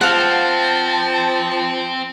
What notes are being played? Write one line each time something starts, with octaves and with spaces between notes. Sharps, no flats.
F3 C4 F5 F#5 A5